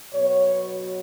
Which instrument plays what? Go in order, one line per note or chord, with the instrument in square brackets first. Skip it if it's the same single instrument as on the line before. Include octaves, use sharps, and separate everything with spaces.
[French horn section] B2 F#3 B3 C#5